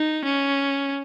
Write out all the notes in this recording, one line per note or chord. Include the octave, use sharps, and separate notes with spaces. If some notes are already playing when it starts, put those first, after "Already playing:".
Already playing: D#4
C#4